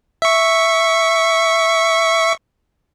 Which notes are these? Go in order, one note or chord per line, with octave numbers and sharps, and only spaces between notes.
E5 C#6